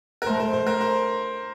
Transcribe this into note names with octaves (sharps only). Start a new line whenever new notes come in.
A#4
A3 C5
C5
C5
A#4
C5